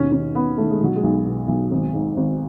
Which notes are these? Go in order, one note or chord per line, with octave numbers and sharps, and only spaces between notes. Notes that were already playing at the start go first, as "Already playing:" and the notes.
Already playing: D#2 B2 C#4
D#3 C#4
D#3 B3
D#3 A3
G#3
B2 F#3
G#3
B1
B2
B1
G#1
G#2
G#1